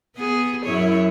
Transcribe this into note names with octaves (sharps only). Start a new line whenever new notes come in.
B3 G#4
F#2 E4 C#5